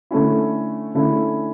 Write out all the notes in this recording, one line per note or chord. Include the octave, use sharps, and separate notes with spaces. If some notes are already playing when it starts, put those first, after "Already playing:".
D3 A3 C#4 E4
D3 A3 C#4 E4